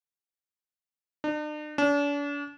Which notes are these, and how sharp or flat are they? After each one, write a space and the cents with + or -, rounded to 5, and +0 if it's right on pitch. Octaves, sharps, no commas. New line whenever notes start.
D4 +45
D4 -40